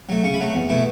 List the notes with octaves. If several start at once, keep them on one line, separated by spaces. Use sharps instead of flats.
F#3 A3
C#3 C#6
B5
F#3 A3
E2
B2 A3 E4